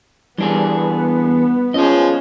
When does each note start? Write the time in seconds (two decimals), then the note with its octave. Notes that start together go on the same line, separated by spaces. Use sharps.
0.38 E3 G3 B3 D4 G#4
1.74 F3 C#4 G#4 C#5 D#5